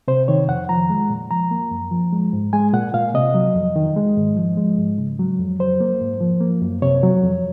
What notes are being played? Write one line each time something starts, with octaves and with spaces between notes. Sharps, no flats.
C3 C5
D#3 C#5
F2 F#5
F3 A#5
G#3
A#2
F3 A#5
A#3
F#2
F3
G#3
G#2
G#3 G#5
A#2 F#5
A#2 F5
C3 D#5
F#3
F2
D#3
G#3
G#2
F3
G#3
G#2
C#3
F#3
F2
F#3 C5
A#3
G#2
F3
A#3
F#2
C3 C#5
F#3
F2